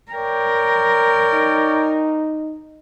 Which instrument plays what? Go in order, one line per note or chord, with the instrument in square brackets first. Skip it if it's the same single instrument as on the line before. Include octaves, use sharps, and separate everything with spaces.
[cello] A#4 [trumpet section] C#5 D5 G5
[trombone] D#4